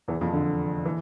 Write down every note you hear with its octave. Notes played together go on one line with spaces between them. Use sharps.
E2 E3
F2 F3
D3
E3